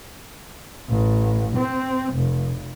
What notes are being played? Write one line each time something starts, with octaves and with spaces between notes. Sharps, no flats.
A1
C4
F1